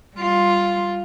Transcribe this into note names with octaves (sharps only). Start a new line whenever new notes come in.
G3 F4